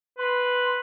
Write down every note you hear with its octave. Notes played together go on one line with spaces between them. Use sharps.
B4 C6